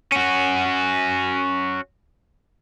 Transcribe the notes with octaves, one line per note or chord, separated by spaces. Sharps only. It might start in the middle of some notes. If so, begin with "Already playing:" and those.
C#4 F#4